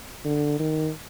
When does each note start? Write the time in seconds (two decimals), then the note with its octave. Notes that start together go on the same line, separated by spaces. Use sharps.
0.25 D3
0.59 D#3